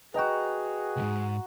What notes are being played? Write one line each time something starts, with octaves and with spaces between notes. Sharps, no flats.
F#4 G#4 B4 D#5 G5 A#5
C#2 G#2